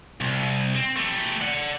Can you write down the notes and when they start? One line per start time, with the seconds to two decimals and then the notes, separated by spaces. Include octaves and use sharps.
0.21 C2
0.75 C4
0.96 A3 G4
1.41 D5 F#5